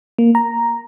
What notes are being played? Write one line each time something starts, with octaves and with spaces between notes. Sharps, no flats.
A#3
A#5